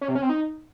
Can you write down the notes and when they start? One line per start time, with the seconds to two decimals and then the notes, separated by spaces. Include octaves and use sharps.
0.01 C#4
0.08 C3
0.15 C#4
0.22 C4
0.29 D#4